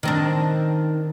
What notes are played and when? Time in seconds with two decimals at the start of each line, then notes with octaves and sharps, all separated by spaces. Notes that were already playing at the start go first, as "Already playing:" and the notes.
0.03 D#3 C4 D4